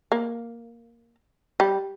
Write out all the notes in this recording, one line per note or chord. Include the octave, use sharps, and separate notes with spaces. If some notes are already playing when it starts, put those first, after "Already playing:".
A#3
G3